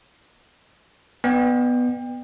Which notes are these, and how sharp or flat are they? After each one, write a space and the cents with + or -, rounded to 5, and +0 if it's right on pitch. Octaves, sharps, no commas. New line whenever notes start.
B3 +0 D5 +45 G5 +30